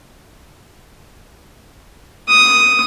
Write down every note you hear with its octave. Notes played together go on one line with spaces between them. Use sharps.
D#6